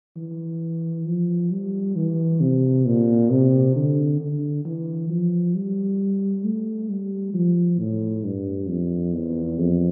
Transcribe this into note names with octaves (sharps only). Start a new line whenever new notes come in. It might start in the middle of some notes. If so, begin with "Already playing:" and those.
E3
F3
G3
E3
C3
A#2
C3
D3
D3
E3
F3
G3
A3
G3
F3
A2
G2
F2
E2
F2